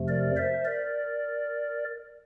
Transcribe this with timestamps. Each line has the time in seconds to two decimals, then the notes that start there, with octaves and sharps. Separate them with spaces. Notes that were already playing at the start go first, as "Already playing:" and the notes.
Already playing: F2 C3 F3 A3
0.08 A#4 D5
0.37 C5 E5
0.65 A#4 D5